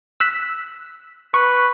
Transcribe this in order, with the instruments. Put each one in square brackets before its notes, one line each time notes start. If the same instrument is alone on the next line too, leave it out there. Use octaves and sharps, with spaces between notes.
[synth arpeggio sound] E6 F#6 B6
[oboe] B4 [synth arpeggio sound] C#6